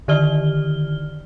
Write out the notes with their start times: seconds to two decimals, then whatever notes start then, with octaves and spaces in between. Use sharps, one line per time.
0.08 D3 D#3 G4 D5 F6 G7